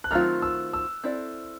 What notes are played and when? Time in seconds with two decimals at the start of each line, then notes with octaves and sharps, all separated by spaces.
0.04 F#6
0.11 D#3 F#3 A3 C4 F4 F6
0.42 E6
0.73 E6
1.04 C4 E4 A4 D5